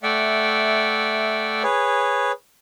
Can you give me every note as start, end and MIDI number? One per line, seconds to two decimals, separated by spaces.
0.03 1.63 57
0.03 1.63 74
0.03 1.63 76
0.03 1.63 78
0.03 1.63 79
1.63 2.32 68
1.63 2.32 71
1.63 2.32 73